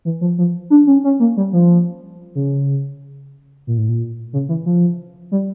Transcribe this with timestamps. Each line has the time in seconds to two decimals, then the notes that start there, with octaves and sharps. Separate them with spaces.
0.05 E3
0.21 F3
0.38 F3
0.70 D4
0.87 C#4
1.04 C#4
1.20 A#3
1.37 G3
1.53 F3
2.35 C#3
3.67 A#2
3.77 A2
3.89 A#2
4.33 C#3
4.49 E3
4.66 F3
5.32 G3